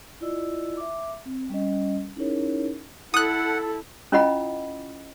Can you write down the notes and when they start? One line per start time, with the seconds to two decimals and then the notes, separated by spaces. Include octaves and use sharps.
0.21 E4 F4 D5 D#5 E6
0.77 E5 D6
1.26 C4
1.50 G3 C#4 D#5
2.16 C#4 D#4 E4 G#4 A#4 C#5
3.14 E4 A4 F#5 D#6 F#6
4.12 C#4 E4 F4 D#5 F#5 B5